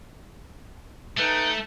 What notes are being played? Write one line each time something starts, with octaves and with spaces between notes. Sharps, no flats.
A3 D#4 B4 G5